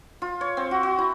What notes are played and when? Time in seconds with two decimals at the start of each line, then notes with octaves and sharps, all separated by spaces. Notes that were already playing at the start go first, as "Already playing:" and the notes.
0.22 F4
0.41 C#5
0.57 C4
0.71 F#4
0.83 F#4
0.99 E4